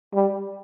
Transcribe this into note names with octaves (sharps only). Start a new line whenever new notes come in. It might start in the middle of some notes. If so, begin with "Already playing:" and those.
G3